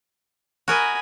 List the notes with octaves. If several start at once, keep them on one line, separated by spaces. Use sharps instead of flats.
F#4 A#4 D#5 G#5 B5